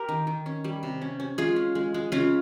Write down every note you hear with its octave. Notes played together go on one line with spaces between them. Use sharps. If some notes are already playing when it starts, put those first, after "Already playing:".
Already playing: G4 A#4
D#3
D#3
C#4
G3
C3
C#4
C#4
G#3 F4 G#4
C#4
G#3
G#3
C#3 C#4 F4